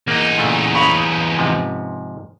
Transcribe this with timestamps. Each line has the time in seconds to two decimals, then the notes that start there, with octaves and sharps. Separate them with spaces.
0.08 E2 A#3 D#4
0.38 A#2 C#3 A3
0.75 C#4 B4 F5
1.39 G#2 C3 F3